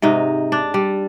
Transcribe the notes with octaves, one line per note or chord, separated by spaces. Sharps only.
G#2 C3 D#4
D4
G3